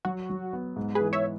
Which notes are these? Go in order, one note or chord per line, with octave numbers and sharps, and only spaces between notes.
F#3 F#4
F#3
B3
G#2
G#4 B4
E3
C#5 E5